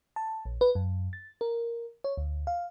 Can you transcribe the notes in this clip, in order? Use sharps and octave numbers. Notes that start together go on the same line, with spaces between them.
A5
A#1
B4
F#2
A6
A#4
C#5
D2
F5